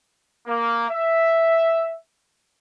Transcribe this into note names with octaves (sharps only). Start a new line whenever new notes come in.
A#3
E5